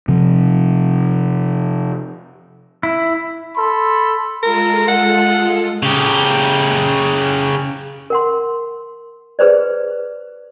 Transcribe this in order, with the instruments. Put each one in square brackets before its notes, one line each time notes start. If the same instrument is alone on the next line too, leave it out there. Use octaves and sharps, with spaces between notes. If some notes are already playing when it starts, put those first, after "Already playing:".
[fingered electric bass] C3 F3
[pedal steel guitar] E4
[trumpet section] A4 B5 C6
[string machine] G#3 F4 A4 [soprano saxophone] A#4
[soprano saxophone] F#5
[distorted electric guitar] C#3 G4
[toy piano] A#4 F#5 C6
G#4 B4 C5 D5